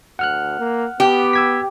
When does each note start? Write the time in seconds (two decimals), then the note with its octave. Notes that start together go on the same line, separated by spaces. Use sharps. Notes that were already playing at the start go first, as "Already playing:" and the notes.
0.19 D2 F#5 F6 F#6
0.59 A#3
1.00 B3 G4
1.33 E6 G#6 B6